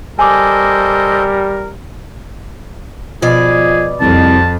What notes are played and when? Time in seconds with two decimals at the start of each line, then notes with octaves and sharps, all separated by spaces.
0.19 G3 A4 A#4 C5 D#5 G#5 D6
3.22 B2 F3 G#4 D5
4.01 C2 F2 A5